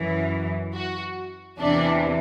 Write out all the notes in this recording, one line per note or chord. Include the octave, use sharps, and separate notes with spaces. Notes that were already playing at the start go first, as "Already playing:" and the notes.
Already playing: F#2 E3
F#4
E2 C3 E3 D4